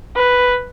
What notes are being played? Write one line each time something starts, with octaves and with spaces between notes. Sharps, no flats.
B4